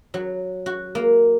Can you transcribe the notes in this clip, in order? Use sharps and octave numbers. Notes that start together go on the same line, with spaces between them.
F#3
F#4
A#3